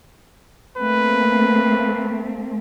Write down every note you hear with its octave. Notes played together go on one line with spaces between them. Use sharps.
A3 A#3 C4 B4